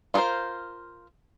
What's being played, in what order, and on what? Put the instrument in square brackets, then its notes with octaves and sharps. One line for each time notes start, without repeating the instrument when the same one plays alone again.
[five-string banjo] F4 F#4 G#4 A#4 C5